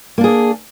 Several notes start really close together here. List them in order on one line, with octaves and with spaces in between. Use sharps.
A#3 D4 G#4